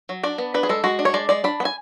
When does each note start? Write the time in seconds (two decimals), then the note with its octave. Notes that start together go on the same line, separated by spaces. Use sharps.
0.09 F#3
0.23 D4 D5
0.38 B3
0.54 D4 B4
0.63 G#4
0.69 G#3 A4
0.84 G#3 F#4
0.99 D4
1.05 C#5
1.14 G#3 D5
1.29 G#3 D5
1.44 D4 B5
1.60 B3
1.65 G#5